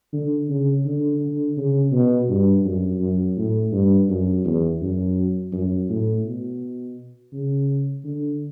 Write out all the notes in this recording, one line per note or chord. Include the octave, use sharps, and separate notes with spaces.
D3
C#3
D3
D3
C#3
B2
G2
F#2
F#2
A2
G2
F#2
E2
F#2
F#2
A2
B2
C#3
D3